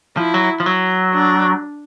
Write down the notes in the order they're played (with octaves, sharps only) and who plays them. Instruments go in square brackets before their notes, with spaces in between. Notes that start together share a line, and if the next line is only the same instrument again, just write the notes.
[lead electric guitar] F3 [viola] E4
[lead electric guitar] F#3
F3
F#3
[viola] D4